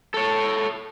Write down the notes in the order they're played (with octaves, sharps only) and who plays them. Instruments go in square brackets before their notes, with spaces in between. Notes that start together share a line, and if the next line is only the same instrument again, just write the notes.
[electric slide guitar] A4 C#5